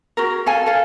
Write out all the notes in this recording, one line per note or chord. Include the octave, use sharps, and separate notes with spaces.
F#4 G#4 A#4
A4 F5 G#5
A4 F5